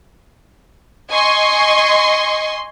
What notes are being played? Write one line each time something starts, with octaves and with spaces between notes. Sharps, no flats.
D#5 G#5 C6 C#6